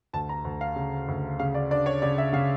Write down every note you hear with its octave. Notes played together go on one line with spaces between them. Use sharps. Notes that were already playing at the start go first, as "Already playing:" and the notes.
D2 A5
A#5
D2
F5
C#3
D2
C#3 F5
D5
D4 D5
C#5
C#3 D5
E5
C#3 F5